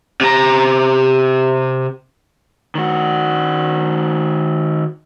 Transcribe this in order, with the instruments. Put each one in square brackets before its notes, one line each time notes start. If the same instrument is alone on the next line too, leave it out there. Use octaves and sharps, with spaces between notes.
[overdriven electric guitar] C3 A#5
[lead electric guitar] D#3 F#4